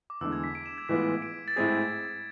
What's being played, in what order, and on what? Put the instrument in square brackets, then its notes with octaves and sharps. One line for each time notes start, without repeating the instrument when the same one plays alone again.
[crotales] D6
[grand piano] E2 D3 G#3 [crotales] E6
[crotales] G#6
B6
D7
E7
G#6
[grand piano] A2 E3 G#3 B3 F4 [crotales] B6
[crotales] D7
A6
[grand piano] A2 G#3 C4 G#4 [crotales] G#6